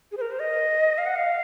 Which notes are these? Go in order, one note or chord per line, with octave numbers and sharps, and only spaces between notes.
G#4
C5
A#4
C5
D#5
F5
F#5
F5